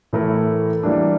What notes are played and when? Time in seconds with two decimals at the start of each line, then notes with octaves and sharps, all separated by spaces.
0.13 A2 E3 A3 E4 A#4
0.83 E3 G3 A#3 D4